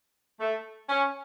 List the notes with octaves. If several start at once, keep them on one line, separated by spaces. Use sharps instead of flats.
A3
C#4